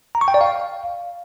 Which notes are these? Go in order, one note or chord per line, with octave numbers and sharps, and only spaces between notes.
A#5
C#6
G5
D5
F5